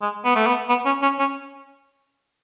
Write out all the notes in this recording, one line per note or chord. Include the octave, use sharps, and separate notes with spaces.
G#3
B3
A3
B3
B3
C#4
C#4
C#4